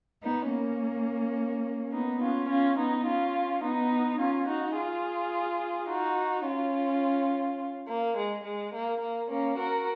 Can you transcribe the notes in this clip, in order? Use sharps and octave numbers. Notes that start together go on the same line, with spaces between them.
B3 D#4
A#3 C#4
B3 D#4
C#4 F4
C#4 F4
B3 D#4
C#4 F4
B3 D#4
C#4 F4
D#4 F#4
F4 G#4
D#4 F#4
C#4 F4
A#3
G#3
G#3
A#3
A#3
A#3 C#4
F#4 A#4